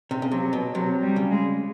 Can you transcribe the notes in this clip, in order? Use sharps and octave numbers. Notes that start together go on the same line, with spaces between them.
C3
C#3
C3 F#3
B2
C3 F#3
G3
C#3
G#3